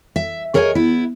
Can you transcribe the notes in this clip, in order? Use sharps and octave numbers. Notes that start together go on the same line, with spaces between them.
E5
G#4 A#4 C#5 D#5 F5 G#5
B3 E4